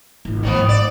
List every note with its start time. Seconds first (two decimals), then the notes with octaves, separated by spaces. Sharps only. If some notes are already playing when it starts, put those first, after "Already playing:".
0.25 G#1 F4
0.43 A1 D#3 F3 B3
0.56 G#2
0.69 D5